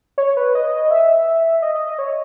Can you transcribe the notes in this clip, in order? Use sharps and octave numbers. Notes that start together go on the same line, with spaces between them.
C#5
B4
D#5
E5
D#5
D#5
D#5
C#5